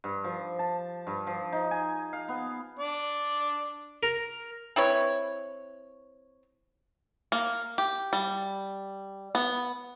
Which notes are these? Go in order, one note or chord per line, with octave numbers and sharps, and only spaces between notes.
G2
F3
A5
G2
F3
D#4
G#5
F5
B3
D4 D5
A#4
C4 E4 B4 C#5
A#3
G4
G3
B3